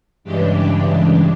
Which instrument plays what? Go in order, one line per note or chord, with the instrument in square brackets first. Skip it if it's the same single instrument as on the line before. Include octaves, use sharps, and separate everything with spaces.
[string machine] G2 C#3 E3 G#3 D4 G4